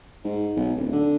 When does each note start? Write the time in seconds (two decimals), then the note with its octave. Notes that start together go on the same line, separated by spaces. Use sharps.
0.25 G#2
0.57 B1
0.77 D1
0.93 D3